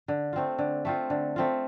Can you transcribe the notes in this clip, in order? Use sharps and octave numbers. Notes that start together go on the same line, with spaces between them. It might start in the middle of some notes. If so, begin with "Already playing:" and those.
D3
A3 C4 F4
D3
A3 C4 F4
D3
A3 C4 F4